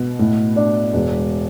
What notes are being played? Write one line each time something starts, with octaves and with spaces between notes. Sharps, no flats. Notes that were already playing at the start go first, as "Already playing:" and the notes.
Already playing: B2
A2
D4
E1